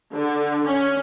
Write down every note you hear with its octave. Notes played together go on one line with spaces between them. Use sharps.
D3
C#4